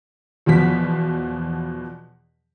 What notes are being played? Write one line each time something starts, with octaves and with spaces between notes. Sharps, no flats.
E2 B2 F3 B6